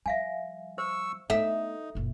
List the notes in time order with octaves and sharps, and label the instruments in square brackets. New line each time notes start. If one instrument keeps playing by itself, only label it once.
[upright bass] F3 G3 [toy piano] E5 F5 G#5
[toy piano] C5 [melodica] C#6 E6
[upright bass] A3 B3 [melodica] D#4 [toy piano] A4 [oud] E5
[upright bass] F#1 A#2